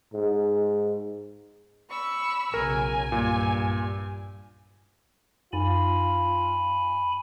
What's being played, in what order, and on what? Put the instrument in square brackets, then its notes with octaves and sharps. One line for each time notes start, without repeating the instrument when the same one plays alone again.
[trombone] G#2
[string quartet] B5 C#6 E6
[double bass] B1 C#3 [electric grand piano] A#4 [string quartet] G#5
[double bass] G2 [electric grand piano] A#2
[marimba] F#2 [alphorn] F4 [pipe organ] G#5 B5